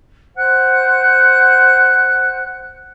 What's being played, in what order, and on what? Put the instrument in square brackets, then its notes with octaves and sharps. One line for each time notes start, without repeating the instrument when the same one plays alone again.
[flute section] C5 F#5 F#6